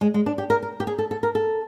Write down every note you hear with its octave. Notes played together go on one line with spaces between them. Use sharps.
G#3
G#3
D4
G4
A#4
A#4
G4
G#4
A4
A4
A#4
A4